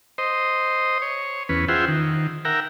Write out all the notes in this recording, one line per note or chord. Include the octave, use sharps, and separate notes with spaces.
C5 D#5
C#5
E2 C#4 B4
F4 G#4 C5 E5 F#5 G5
D#3
A#4 E5 F#5 G5 A#5